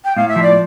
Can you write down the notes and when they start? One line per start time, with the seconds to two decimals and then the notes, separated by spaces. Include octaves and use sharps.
0.05 G5
0.16 A2 F5
0.29 E5
0.36 F3
0.43 D5